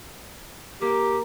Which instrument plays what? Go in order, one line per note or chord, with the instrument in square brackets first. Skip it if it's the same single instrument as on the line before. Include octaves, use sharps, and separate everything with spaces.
[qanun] A#3 [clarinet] G4